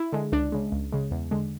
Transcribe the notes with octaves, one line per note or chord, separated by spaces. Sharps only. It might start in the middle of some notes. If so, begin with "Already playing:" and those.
Already playing: E4
D3 G#3
C#2 D4
C#3 G#3
C#2
C#3 G#3
E2
D3 G#3